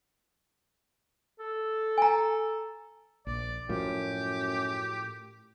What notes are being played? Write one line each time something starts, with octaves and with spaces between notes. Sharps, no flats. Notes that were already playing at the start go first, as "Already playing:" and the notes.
A4
G#5 A#5
A#1 D5
F#2 A2 F3 G4